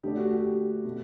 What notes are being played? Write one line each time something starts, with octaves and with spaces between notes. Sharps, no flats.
D3 A3 D4 G4
F#4
G4
G4
B2 A3